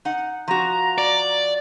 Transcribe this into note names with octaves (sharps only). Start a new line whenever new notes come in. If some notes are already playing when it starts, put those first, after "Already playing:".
D#4 F#5
F3 F#4 A#5
D5